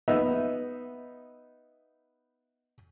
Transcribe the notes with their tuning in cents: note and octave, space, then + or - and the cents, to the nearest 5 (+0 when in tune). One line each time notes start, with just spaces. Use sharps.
B3 +0 D#4 +0 E5 +0